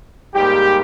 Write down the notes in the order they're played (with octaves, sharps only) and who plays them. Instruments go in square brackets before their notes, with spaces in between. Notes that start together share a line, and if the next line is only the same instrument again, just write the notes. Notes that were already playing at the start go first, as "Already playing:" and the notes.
[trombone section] G#2 G3 A#3 G4